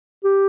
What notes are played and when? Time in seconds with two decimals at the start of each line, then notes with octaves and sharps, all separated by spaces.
0.24 G4